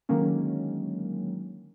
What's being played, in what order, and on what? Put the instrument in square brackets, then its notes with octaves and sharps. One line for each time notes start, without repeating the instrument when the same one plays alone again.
[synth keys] D3 D#3 F#3 G#3 A#3 C#4